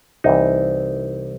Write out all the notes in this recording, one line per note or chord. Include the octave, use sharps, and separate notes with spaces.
C2 C3 E3 D#4